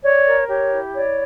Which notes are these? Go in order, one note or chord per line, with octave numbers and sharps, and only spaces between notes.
C#5 D5
A#4
G4 C#5
E4
C#5 D5